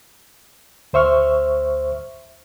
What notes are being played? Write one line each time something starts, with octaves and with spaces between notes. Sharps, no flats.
D2 C5 E5 C#6 F6